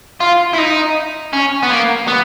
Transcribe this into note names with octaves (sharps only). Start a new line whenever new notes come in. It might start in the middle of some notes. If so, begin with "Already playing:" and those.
F4
E4
D#4
C#4
B3
A#3
B3